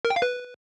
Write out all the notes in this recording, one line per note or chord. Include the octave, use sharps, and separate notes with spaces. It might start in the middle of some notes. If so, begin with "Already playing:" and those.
A#4
G5
F5
B4